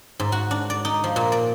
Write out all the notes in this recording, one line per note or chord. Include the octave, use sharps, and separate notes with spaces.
G#2
F#4
D4
D5
D#4
F3
A#2
D5